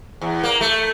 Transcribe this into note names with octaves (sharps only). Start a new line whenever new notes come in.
E2
A#3
A3